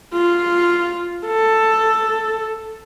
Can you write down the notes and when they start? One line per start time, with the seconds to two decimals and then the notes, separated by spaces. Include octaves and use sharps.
0.13 F4
1.26 A4